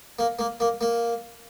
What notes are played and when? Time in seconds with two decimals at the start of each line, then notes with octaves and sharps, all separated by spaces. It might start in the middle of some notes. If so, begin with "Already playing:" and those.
0.19 A#3
0.39 A#3
0.60 A#3
0.81 A#3